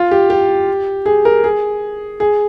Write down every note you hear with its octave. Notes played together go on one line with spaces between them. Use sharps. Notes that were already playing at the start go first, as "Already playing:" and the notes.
Already playing: F4
G4
G4
G#4
A#4
G#4
G#4